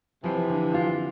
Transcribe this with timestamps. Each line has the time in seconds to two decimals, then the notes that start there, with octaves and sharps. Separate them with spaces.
0.24 C3 E3 F3
0.49 D3
0.74 F4